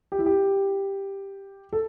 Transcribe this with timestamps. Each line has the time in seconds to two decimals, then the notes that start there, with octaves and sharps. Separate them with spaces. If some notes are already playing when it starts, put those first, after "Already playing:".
0.12 G4
0.19 E4
0.26 G4
1.73 A4